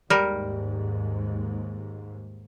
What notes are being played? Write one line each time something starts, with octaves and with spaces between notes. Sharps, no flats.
D#2 G#2 G3 A#4